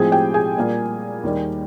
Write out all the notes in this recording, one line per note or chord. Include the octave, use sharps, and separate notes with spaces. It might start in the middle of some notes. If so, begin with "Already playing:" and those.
Already playing: A2 F3 G#3 C4 G#4 G#5
G4 G5
G#4 G#5
A#2 G3 A#3
D#2 D#3 G3